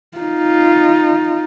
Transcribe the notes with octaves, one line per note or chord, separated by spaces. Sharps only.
D#4 F4